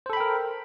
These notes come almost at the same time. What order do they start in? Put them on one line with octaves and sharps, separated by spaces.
C5 A4 B5 G5 A#4